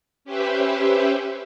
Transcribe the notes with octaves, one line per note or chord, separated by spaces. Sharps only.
C#4 G4 B4 C5 E5